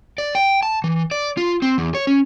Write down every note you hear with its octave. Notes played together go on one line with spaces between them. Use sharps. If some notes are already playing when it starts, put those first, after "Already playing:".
D5
G5
A5
E3
D5
F4
C4
E2
C#5
C#4